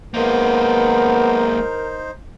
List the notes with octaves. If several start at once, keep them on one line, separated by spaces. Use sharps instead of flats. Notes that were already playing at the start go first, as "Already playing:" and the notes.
G#3 A#3 B3 D#4 A#4 C5